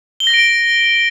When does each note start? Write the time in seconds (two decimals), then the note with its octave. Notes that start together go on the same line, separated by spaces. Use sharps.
0.20 G7
0.27 A#6
0.34 D7